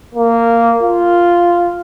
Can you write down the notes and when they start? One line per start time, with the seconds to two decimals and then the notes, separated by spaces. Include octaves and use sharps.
0.15 A#3
0.83 F4